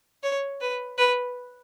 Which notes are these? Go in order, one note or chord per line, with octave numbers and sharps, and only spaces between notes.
C#5
B4
B4